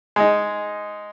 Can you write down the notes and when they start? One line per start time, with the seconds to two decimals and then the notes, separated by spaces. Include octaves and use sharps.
0.16 G#3 D#4